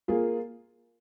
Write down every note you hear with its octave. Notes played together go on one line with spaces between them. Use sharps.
A#3 F4 G#4